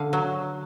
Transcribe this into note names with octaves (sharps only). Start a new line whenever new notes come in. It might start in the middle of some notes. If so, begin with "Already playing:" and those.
Already playing: D3 F5
F#3